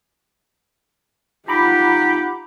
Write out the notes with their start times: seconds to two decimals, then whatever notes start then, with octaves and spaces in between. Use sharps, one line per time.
1.48 D#4 F4 G4 F#5 A#5 B5 D6